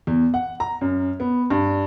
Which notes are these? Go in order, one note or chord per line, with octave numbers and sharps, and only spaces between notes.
E2
F#5
A#5
F#2
B3
G2